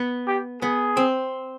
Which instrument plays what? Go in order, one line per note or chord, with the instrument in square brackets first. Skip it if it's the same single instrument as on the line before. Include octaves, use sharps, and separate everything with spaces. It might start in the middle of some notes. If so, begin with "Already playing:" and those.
Already playing: [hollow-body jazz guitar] B3
[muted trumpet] G4
[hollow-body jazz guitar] B3 [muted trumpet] G#4
[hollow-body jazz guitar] C4